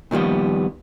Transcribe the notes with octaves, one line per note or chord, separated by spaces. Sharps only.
A#2 D#3 F3 G3 B3